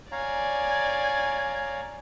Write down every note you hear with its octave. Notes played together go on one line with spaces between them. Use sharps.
C#5 D5 F5 G#5 A#5